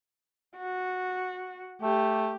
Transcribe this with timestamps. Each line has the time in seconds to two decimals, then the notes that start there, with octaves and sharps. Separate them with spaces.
0.57 F#4
1.82 A3 G4